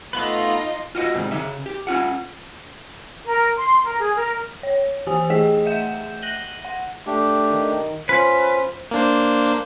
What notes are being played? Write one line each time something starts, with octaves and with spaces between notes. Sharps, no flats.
A3 B3 D#4 F4 B4 D#5
F4 F#4 C#5 D#5
G#2 C3 D#3 G3
C#3 E5
G4
C#4 F4 F#5
A#4
C6
A#4
G#4
A#4
C#5
E3 G4 C5 G#5 D#6
A3 G#4 D#5 G5 E6 B6
E5 F#5 G6 E7
F#6 A#6 D#7 F#7 G7
F#5
A3 D4 G4
D#3
C#4 F4 B4 C5
A#3 D4 C5